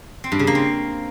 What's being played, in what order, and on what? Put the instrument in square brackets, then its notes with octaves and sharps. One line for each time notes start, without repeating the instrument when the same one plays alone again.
[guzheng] C4
G2
C#3
A#3
C4